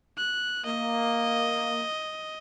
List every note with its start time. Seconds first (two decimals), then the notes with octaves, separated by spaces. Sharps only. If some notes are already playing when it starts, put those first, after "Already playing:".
0.18 F#6
0.66 A#3 D#5